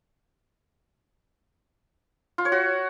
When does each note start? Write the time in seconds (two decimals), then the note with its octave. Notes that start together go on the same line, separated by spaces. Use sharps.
2.38 F4
2.45 C#5
2.52 F#4